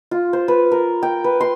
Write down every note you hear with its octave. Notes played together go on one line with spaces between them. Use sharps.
F4
C5
B4
A#4
G5
B4
C6